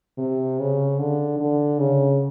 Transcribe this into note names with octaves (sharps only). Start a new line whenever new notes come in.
C3
C#3
D3
D3
C#3